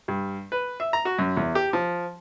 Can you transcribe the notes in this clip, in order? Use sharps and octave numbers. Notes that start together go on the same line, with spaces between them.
G2
B4
E5
A#5
F#4
F#2
E2
G4
F3